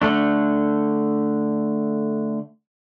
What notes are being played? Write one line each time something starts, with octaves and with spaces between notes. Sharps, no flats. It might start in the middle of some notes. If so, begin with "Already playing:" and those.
D3 A3 D4